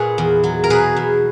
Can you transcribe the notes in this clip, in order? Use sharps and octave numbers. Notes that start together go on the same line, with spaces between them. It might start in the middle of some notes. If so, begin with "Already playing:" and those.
Already playing: A#2 G#4 B4 C#5
E2
F#3
A#4
B2 G#4 B4
E2